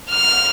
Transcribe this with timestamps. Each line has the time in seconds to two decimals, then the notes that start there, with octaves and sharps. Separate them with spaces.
0.11 F6